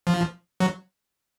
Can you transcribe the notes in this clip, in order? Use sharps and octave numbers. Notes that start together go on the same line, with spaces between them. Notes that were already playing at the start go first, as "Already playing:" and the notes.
F3
F#3